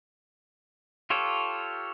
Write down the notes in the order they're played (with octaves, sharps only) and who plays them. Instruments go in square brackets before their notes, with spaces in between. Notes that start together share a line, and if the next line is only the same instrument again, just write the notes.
[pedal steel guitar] F4 G4 A4 C#5